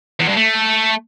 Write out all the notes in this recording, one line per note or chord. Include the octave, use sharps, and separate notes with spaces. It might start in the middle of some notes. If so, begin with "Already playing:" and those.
E2
G2
A3